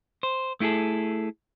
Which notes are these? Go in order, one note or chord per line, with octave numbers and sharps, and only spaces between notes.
C5
A3 E4 F4 G#4 A4